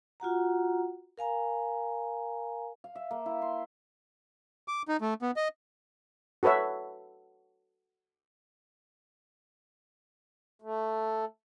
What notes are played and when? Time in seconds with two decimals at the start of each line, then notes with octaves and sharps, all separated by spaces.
0.20 F4 F#4 F#5 A#5
1.18 A#4 F5 G#5 A#5
2.84 F5
2.95 E5
3.11 A#3
3.26 E4
3.42 C6
4.68 D6
4.88 D#4
5.01 A3
5.22 B3
5.36 D#5
6.43 F#4 A4 B4 C#5 E5
10.62 A3